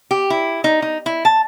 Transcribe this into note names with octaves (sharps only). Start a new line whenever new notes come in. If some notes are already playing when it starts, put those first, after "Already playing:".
G4
E4
D#4
D#4
E4
A5